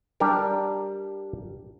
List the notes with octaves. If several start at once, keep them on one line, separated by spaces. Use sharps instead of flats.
G3 D4 G4 A#4